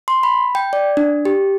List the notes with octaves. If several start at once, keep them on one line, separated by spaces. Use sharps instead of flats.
C6
B5
G5
D5
D4
G4